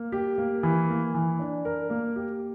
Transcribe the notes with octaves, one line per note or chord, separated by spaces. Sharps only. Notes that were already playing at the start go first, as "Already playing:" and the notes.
Already playing: A#3
G4
A#3
E3
A#3
E3
D4
A#4
A#3
G4